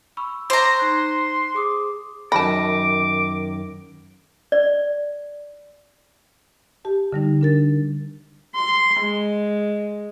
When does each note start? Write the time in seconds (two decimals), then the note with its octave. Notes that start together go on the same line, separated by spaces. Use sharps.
0.17 B5 C#6 E6
0.50 C5 A#5 D6
0.79 D#4 C6 F#6
1.55 G#4 D6 D#6
2.32 F#2 D#3 A5 B5 D6 A#6
4.52 D5
6.85 G4 A5
7.13 D3 G3 D#4
7.41 D4 A#4 A6
8.55 C6
9.01 G#3